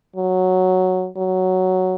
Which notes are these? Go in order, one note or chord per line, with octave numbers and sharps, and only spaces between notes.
F#3
F#3